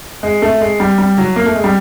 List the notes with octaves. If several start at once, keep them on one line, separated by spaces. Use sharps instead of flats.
G#3
A3
G#3
G3
G3
F#3
A#3
A3
G#3
G3